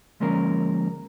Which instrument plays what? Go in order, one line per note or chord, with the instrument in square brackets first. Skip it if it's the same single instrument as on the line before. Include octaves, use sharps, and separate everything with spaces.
[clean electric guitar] D3 F3 G#3 A#3 C#4 A#4